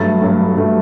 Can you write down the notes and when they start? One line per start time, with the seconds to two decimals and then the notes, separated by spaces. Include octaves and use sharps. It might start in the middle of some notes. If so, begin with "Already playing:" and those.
Already playing: G2 F#3 A3 A6
0.22 G2 F#3 A3
0.56 G2 F#3 A3